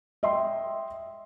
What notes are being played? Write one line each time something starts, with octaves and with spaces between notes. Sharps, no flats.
D#5 E5 G5 C6